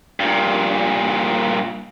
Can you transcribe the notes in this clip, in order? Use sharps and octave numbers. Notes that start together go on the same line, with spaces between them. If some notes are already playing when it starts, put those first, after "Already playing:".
G2 A#2